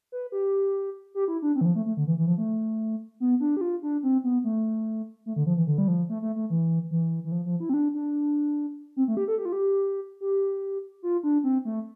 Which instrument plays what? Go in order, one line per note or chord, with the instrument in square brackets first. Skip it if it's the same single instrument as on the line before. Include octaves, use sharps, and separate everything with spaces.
[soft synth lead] B4
G4
G4
E4
D4
C4
E3
F3
A3
A3
D3
E3
E3
F3
A3
B3
D4
G4
F4
D4
C4
B3
A3
A3
D3
F3
E3
D3
G3
F3
A3
A3
A3
E3
E3
E3
F3
F3
E4
C4
D4
D4
C4
A3
G4
A4
G4
F4
G4
G4
F4
D4
C4
A3